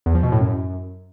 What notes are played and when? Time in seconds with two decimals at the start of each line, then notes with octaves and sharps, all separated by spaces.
0.06 E2
0.15 F3
0.23 B2
0.32 A2
0.40 F#2